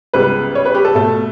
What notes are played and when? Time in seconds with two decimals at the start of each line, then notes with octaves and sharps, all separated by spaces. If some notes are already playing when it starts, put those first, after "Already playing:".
0.14 C#2 C#3 G3 B3 B4
0.55 C#5
0.65 B4
0.75 G4
0.85 A4
0.95 B2 A3 A4